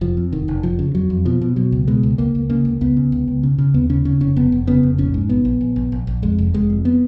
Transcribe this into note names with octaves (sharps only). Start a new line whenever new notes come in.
F1 F3
F2
F1 D#3
F1
F1 F3
C#3
F2 F#3
F2
B2 F3
B2
B2 F#3
C#2
B2 G#3
C#2
C#2 A#3
C#2
C#3 A#3
C#2
C#2 B3
C#3
C#2
C#2
C#3
C#3
D#2 B3
C#3 C#4
C#3 C#4
F1 C#4
F1 B3
F1
C#3 B3
F1
A#1 C#4
G#2
A#1 B3
A#1
A#1
A#1
A#1
A#1
F2 G#3
F1
F1 G#3
F2
B3